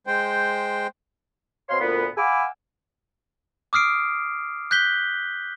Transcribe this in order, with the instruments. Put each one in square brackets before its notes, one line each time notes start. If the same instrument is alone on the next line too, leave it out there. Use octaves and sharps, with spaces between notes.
[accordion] G#3 C5 G5
[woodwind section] B2 C4 C#5 F5 C6
D2 A#2 B3
F5 F#5 G#5 B5 D6 E6
[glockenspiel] D6 D#6 F6 C7 D7
F#6 G6 B6 G7